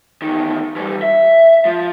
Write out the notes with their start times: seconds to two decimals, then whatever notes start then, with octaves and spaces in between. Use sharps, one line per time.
0.22 E2 D#3
0.76 E3 G3
1.02 E5
1.65 F3